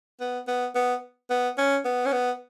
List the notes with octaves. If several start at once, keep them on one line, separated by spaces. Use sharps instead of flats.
B3
B3
B3
B3
C#4
B3
C#4
B3